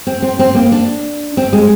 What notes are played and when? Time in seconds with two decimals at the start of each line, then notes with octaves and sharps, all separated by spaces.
0.07 C4
0.22 C4
0.39 C4
0.55 A#3
0.72 D4
1.37 C4
1.53 G#3